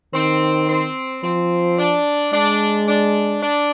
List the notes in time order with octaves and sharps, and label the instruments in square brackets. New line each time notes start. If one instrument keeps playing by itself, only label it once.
[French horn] D#3 [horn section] C4
[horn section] C4
[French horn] F3 [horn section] C4
[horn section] D4
[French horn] G#3 [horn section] D4
[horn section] D4
D4